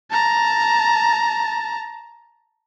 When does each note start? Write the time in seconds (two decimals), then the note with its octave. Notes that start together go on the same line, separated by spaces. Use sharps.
0.11 A5 A#5